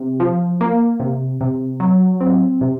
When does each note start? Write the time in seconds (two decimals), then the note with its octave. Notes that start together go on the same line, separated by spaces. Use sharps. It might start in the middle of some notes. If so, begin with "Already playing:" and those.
Already playing: C3
0.20 F3
0.61 A#3
1.00 C3
1.41 C3
1.80 F#3
2.21 C4
2.61 C3